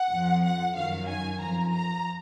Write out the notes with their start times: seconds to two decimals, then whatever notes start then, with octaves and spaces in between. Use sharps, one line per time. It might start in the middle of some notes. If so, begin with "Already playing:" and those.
Already playing: F#5
0.10 F2 F3
0.43 F#5
0.75 F#2 D#3 F#3 F5
1.08 G#5
1.40 F2 F3 A#5
1.72 A#5